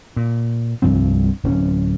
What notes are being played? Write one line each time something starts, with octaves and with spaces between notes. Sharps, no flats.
A#2
C2 G2 F3 C4
D1 C#4